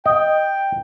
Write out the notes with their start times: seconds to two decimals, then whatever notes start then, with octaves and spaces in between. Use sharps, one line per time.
0.06 D#5 G5